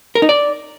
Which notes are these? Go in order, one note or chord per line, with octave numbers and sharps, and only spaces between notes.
A#4
D#4
D5